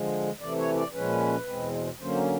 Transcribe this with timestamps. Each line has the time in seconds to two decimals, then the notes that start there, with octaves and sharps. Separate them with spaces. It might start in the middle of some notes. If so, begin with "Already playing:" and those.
Already playing: D3 F3 G#3
0.41 C3 E3 A3 D5
0.58 C#5
0.76 D5
0.94 A#2 F3 G#3 C#4 B4
1.47 E2 B2 G#3 C4
2.00 D3 F#3 A#3 C#4 C5